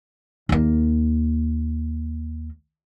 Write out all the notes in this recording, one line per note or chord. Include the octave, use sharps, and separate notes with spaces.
D#2 A#3